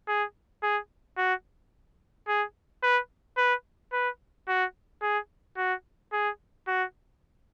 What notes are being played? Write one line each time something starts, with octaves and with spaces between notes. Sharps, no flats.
G#4
G#4
F#4
G#4
B4
B4
B4
F#4
G#4
F#4
G#4
F#4